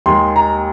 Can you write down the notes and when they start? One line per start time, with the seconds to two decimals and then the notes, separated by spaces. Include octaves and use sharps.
0.06 D#2 D#3 G#3 C6
0.36 A#5